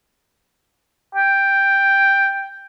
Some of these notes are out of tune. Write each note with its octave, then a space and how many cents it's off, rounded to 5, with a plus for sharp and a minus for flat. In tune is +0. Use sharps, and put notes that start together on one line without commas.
G5 +5